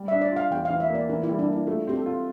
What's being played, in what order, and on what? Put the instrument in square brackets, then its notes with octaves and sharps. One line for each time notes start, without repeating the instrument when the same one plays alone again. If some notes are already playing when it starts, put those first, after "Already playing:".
Already playing: [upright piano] G3
[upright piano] D4 [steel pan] E5
[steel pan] D5
[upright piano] F4 [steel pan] F5
[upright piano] E2 [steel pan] G5
[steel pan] F5
[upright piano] E3
[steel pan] E5
[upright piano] A#3
[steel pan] D5
[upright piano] E3 [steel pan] A#4
[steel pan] E4
[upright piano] G3
[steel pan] D4
[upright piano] A#3 [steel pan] E4
[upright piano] A3 [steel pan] F4
[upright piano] C4 [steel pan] G4
[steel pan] A4
[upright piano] F4